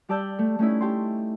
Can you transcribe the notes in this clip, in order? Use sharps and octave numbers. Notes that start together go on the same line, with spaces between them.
G3 G4 D5 A5 E6 G6
A3
A3 C#4 D#4 E4
G4 G5 A5 C6